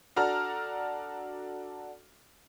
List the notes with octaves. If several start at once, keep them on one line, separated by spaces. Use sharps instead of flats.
D4 F#4 A4 A#5 F6